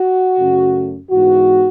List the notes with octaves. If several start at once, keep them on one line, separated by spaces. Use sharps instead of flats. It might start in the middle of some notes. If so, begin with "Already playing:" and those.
Already playing: F#4
F#2 C#3 F#3 A3
G#2 E3 B3 F#4